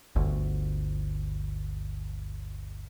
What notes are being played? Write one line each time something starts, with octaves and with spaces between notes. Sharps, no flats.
G1 D2